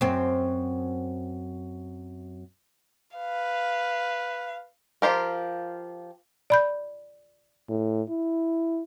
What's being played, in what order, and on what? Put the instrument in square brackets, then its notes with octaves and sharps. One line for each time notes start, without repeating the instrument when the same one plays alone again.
[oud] F#2 C4
[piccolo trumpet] B4 [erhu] F5
[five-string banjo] F3 F4 G4 A#4
[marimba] D5 B5 G6
[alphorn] A2
E4